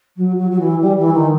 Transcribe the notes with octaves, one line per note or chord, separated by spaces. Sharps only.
F#3
F#3
F#3
E3
G3
E3
D#3